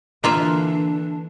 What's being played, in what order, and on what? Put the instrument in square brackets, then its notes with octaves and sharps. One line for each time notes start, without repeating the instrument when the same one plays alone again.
[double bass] D3 E3 [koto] A#3 F4 E5 [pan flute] D4